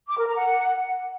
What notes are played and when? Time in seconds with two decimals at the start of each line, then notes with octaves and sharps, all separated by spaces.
0.09 D6
0.18 A#4
0.27 A#5
0.36 F#5